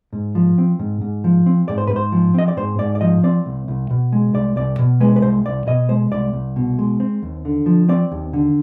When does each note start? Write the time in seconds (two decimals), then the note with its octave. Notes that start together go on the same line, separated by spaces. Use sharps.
0.13 G#2
0.35 F3
0.58 C4
0.79 G#2
1.01 G#2
1.24 F3
1.46 C4
1.68 G#2 D5
1.78 C5
1.87 G#2 B4
1.96 C5
2.12 F3
2.34 C4 D#5
2.48 D5
2.57 G#2 C5
2.78 G#2 D5
2.95 D5
3.01 F3 D#5
3.23 C4 D5
3.46 C2
3.68 C2
3.91 B2
4.13 G#3
4.34 C2 D5
4.56 C2 D5
4.79 B2
5.00 G#3 B4
5.16 B4
5.22 C2 C5
5.45 C2 D5
5.67 B2 D#5
5.89 G#3 C5
6.11 C2 D5
6.33 C2
6.56 B2
6.79 G#3
7.00 C4
7.23 D#2
7.45 D3
7.66 F3
7.89 C4 D5
8.12 D#2
8.33 D3